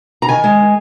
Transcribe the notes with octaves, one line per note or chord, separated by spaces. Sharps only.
A#5
D#3 G#5
G#3